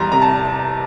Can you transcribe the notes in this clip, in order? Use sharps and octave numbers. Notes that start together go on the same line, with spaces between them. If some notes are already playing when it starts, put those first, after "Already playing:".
Already playing: E2 G3 A#5 C6
C3 A#5
A5